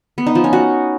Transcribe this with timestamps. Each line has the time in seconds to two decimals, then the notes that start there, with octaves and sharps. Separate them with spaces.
0.18 B3
0.27 D#4
0.35 F3
0.44 C#4
0.53 F#4